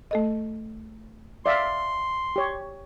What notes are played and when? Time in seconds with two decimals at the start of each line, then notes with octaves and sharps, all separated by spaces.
0.11 A3 A4 D#5
1.46 D5 E5 F5 C6
2.36 G4 C#5